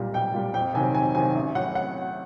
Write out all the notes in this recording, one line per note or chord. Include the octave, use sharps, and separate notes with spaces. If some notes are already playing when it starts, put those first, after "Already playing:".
Already playing: B1 A#2 G3
B1 G5
A#2 G3
F2 G5
C3 D#3 F#3 G#5
F2 G#5
C3 D#3 F#3 G#5
A1
A2 F#3 F#5
F#5